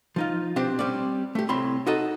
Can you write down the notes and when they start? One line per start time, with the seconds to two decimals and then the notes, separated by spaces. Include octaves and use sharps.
0.16 F3 D#4 F4
0.56 B2 C4 D4 G4 C5
0.79 G3 C4 C#4 D5
1.35 A3 G4
1.49 C2 A2 C4 C#5 B5 C6
1.87 D#4 F#4 A4 D#5